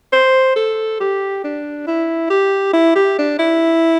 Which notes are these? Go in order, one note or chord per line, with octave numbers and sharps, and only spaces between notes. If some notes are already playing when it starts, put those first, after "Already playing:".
C5
A4
G4
D4
E4
G4
E4
G4
D4
E4